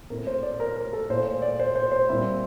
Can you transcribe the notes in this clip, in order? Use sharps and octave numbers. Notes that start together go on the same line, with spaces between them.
A#2 A3 C4 E4 A#4
C5
D5
A#4
A#4
A4
A#2 A3 E4 C5
C5
D5
C5
C5
C5
A#2 G3 C4 E4